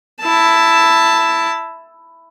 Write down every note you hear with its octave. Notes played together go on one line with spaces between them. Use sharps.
E4 A5